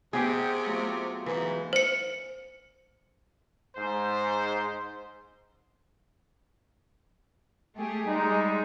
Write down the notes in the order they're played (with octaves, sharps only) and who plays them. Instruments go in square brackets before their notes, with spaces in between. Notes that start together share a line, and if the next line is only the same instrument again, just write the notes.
[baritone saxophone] C3 [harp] B3 F#5 G5 [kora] G4 G#4
[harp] F#3 A3 F4
D6
[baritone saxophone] G#2 [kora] E3
[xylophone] C5 C#7
[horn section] G#2 C5
[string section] A3 G4 G#4
[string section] G3 G#3 [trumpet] D#4